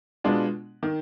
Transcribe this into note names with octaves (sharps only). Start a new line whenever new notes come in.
B2 G#3 B3 D4 F4
D#3